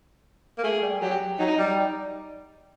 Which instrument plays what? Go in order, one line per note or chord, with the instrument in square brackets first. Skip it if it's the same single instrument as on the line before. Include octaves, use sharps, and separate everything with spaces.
[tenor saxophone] A#3
[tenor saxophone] A3 [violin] G#4
[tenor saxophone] G3
[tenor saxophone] F#3 [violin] G4
[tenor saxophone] F#3 [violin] D#4
[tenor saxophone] G3